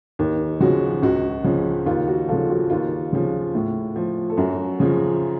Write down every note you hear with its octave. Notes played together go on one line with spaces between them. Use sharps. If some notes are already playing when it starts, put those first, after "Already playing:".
D#2
C#3 F3 F#4
C#2 F#4
C#3 F3
D#2 F4
F#4
C#3 F3 F4 A4
F#4
D#2 F4
C#3 F3
A2
F3
A4
F#2 F#4
C#3 F3